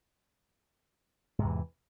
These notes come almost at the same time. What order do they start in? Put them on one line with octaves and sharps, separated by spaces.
G#2 C3 E2 E3